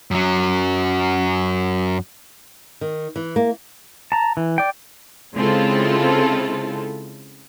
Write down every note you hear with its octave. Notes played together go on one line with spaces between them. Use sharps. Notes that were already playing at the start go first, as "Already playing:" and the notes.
F#2 F#3
D#3
E3
A#3
A5 A#5
E3
D5 G5
C#3 G#3 C4 E4 F4 A4